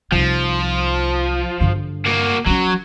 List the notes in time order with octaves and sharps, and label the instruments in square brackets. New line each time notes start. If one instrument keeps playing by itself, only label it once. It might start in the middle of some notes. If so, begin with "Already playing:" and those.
[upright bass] C2 D#4 [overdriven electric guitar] F3
[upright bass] G2 D3
[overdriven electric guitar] A#3 F#4
[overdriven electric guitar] F#3 [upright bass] C#4 F4